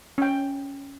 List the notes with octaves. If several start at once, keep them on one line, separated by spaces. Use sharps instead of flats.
C#4 G5